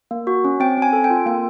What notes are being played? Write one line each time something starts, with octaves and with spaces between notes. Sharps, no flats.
A#3
F#4
C#4
C4 G5
C4 G#5
A4
G5
F4
A#3 G5